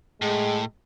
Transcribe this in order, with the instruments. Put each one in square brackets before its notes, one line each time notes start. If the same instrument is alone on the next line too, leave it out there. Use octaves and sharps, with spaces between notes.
[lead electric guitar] A2 [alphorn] G#3